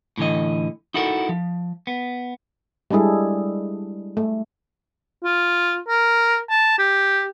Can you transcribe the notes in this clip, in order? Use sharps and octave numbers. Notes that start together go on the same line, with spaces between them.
A2 D3 E3 D#5
D#4 E4 F#4 A4 A#4
F3
B3
G3 G#3 D4 E4 G#4 A4
A3
F4
A#4
A5
G4